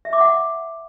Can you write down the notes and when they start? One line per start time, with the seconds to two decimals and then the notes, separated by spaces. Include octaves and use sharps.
0.05 E5
0.13 D6
0.21 F#5